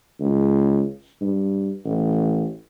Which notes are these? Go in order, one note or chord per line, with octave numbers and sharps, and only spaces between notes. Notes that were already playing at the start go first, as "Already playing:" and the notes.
C#2
G2
A1